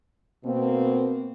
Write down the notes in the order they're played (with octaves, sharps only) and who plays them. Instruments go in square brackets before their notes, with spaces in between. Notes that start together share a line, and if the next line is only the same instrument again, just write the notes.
[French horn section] B2 A#3 C4